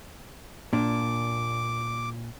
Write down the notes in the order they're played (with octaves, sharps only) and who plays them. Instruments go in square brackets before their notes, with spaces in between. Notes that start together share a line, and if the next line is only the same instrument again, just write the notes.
[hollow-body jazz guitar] A#2 D4 [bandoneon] D6